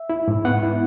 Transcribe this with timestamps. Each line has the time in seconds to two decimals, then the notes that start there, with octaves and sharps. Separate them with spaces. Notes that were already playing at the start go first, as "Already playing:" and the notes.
Already playing: E5
0.10 E4
0.28 G#2
0.45 B3 F#5
0.63 E4